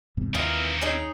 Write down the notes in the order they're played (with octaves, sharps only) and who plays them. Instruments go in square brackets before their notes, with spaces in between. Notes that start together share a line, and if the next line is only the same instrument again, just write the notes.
[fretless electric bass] E2 G#2 C3
[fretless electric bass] D#2 [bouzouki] D#3 E3 F4 [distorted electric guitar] C4 A#4
[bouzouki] D#4 G#4 C#5